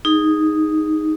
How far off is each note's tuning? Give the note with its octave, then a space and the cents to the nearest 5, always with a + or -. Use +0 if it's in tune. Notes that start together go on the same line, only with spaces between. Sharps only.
D#4 +0 G#4 -20